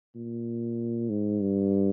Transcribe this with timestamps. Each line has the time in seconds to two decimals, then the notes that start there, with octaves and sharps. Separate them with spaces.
0.16 A#2
1.09 G#2
1.42 G2